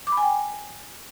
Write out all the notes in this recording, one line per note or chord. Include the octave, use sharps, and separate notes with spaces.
D6
B5
G#5
G5